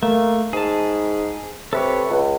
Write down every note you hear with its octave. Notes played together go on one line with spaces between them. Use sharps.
A3 A#3
G#2 G#4 A5
C3 A4 B4 C#5
C#2